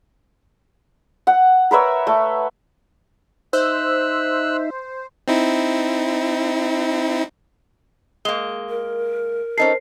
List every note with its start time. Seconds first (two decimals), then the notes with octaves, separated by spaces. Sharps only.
1.27 F#5
1.71 A#4 B4 C#5 E5
2.07 A3
3.53 D#4 C5 E5 E6 F#6
5.28 C4 D#4 E4
8.25 G#3 A#3 G7
8.69 A#4
9.58 C#4 D#4 A4 C5 C7